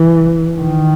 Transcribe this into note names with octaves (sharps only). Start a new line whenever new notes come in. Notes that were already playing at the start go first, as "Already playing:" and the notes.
Already playing: E3
D#3